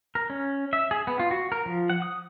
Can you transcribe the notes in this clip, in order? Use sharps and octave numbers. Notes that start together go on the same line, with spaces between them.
A#4
C#4
E5
G#4
B3
F4
F#4
A#4
F3
F#5
D#6